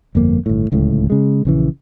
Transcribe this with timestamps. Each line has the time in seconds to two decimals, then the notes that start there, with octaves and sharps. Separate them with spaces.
0.15 G1 F2 A#3
0.46 G1 A2
0.72 D1 C#2 A2
1.10 C#3 G#3
1.45 A#1 C#3 E3